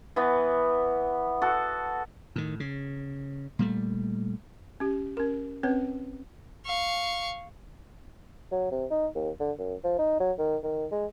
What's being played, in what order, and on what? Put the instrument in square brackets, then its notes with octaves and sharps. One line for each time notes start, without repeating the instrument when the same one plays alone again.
[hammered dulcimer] E3 B3
F#4 A4
[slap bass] A2 D#3
C#3
A#2 G3 A3
[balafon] C#4 G4
C#4 A#4
C4 C#4 B4 C#5
[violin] F5 C#6
[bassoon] F#3
C3
D#4
D#2
D3
F#2
F3
D#4
F#3
D#3
D#3
G#3